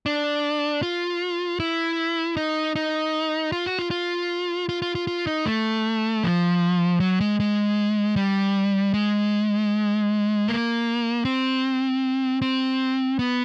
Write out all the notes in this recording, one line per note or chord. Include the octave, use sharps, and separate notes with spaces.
D4
F4
E4
D#4
D#4
F4
F#4
F4
F4
F4
F4
F4
F4
D#4
A3
F3
F#3
G#3
G#3
G3
G#3
A#3
C4
C4
B3